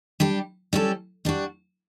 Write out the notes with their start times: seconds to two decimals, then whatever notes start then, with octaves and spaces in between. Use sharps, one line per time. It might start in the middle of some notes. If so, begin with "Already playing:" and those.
0.20 G3 D4 G4
0.73 G3 C#4 F#4 A4
1.25 G3 D4 F#4